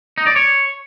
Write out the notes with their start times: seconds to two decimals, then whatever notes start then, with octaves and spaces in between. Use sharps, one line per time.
0.18 D#4
0.27 D5
0.36 C#5